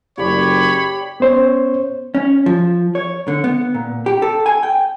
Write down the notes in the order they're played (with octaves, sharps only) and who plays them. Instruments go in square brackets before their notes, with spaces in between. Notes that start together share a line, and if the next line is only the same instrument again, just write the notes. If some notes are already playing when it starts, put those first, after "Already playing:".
[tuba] F#1 [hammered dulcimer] G4 D5 [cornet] C#5 [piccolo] B5
[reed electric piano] B3 C#4 C5 C#5
[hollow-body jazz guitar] C#4
F3
C#5
D3
B3
A#2
G4
A4
G#5
G5